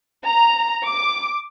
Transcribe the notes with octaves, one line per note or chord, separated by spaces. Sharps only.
A#5
D6